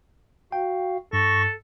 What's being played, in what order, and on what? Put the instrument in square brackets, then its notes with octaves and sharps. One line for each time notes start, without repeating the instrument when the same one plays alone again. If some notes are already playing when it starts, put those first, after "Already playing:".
[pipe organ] F#4 F5 [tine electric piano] G5
[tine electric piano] G2 [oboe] A4 [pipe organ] C#6 A#6